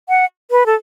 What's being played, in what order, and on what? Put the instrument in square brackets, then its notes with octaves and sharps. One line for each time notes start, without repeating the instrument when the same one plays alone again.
[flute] F#5
B4
A4